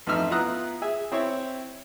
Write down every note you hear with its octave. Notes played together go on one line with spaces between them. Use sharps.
A1 F2 D#4 E5 F6
B3 E4 F4 A#5 D#6 F#6
G#4 E5 G#5
C4 E4 C#5